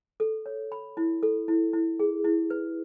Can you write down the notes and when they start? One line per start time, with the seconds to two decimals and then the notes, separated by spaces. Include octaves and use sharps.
0.20 A4
0.46 C#5
0.72 B5
0.97 E4
1.23 A4
1.48 E4
1.73 E4
2.00 G#4
2.24 E4
2.50 B4